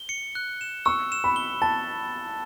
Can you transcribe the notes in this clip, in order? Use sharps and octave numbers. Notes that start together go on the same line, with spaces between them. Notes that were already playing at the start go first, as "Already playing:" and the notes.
Already playing: G7
C#7
F#6
E7
C#6 E6
E7
B5
G7
A5 A6